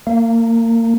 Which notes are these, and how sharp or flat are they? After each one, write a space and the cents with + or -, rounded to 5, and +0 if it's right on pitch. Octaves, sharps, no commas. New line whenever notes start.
A#3 -30